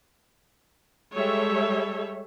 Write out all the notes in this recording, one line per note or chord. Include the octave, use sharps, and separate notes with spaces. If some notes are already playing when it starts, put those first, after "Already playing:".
G3 G#3 A4 C#5 E5